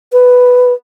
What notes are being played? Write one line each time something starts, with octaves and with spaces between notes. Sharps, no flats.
B4